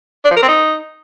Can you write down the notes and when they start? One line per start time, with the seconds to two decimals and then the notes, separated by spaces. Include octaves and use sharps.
0.25 D4
0.31 F3
0.36 A#4
0.42 C4
0.48 D#4